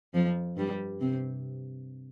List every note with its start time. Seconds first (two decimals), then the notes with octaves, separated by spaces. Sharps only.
0.14 F2 F3
0.57 G2 G3
1.01 C3 C4